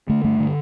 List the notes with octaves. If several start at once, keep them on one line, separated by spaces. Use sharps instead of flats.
D3 A3
G2 A3
D3